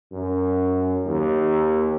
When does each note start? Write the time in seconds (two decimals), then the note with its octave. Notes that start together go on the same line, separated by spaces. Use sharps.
0.12 F#2
1.06 D#2